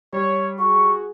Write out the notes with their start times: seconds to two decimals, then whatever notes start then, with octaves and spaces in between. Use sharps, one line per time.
0.13 G3 C#5
0.58 F#4 G#4 C#6